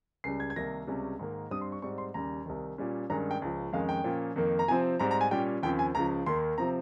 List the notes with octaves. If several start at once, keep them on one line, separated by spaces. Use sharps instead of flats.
C#2 C#3 G3 C7
G#6
G#6
C2 C3 D#3 A#3 A#6
C#2 C3 G3 C#4
G#2 D#3 A#3
G2 G3 C4 D#6
C6
C#6
G#2 G3 C4 C#6
C6
D#2 C#3 G3 A#5
C2 C3 D#3
A#2 G3 C#4
G2 D#3 G#3 C#4 A#5
G5
C#2 C#3 F3
F2 D#3 G#3 C#4 F5
G5
A#2 F3 A#3 C#4
F2 D#3 A#3
A#5
C3 F3 C4 G#5
G#2 G3 C4 A#5
A#5
G#5
A#2 G3 C#4 G5
D#2 C#3 F3 C4 G5
G#5
C#2 C#3 F3 A#5
D#2 D#3 A#3 C6
C3 F3 C4 A#5